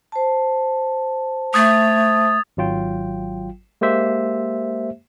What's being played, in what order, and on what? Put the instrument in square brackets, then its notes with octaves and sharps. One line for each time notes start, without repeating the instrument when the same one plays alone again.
[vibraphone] C5 A5
[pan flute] A3 [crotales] D#6 G#6 A6
[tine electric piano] G#1 F#3 F4 G5
G#3 A#3 G4 C5 E5